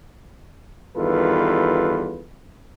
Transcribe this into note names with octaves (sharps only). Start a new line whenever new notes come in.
E2 G2 D#3 F4 A4 B4